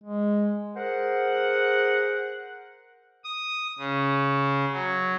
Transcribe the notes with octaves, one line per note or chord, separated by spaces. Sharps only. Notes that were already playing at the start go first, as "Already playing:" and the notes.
G#3
G#4 A#4 C5 F#5
D#6
C#3
F#3